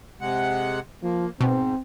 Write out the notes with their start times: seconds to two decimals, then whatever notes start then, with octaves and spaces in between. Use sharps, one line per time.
0.21 C3 G#3 F#5
1.03 F3 A#3
1.41 G#2 B2 C4